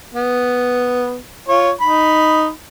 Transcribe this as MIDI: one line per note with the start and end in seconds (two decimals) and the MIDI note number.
0.15 1.16 59
1.49 1.71 65
1.49 1.71 73
1.81 2.49 63
1.81 2.49 83